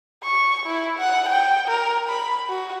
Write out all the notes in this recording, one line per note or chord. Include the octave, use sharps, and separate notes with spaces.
C#6
E4
F#5
G5
A#4
B5
F#4